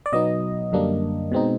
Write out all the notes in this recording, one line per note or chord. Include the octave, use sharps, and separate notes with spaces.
D5
B2 F#3 B3 D#4 D#5
F#2 D3 G3 A#3 D4
B2 G#3 C4 D#4